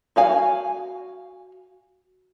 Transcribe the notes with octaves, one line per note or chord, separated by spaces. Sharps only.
F#4 F5 G#5